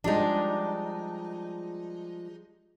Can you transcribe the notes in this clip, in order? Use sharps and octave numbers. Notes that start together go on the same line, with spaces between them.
F3 G3 G#3 D4 D#4